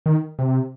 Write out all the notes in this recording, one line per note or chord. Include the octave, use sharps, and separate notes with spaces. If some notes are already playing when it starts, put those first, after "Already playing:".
D#3
C3